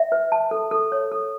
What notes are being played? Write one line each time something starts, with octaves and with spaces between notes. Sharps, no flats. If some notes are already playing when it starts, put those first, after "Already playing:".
Already playing: E5
B4
A5
A4
A4
C#5
A4